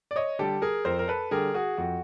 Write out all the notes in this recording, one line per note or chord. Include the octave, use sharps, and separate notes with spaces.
D5
C#5 D#5
D3 G3 G4 A4
G#4 A#4
F2 A#4 C5
A#4
A4 B4
D3 G3 G#4 A#4
F#4 G#4
F2 F#4